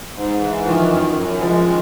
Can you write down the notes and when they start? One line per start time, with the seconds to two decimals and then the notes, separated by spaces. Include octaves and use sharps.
0.16 G#2
0.41 E3
0.66 D#3 F3
0.90 F#2
1.16 F#2
1.40 F3 G#3
1.66 D#3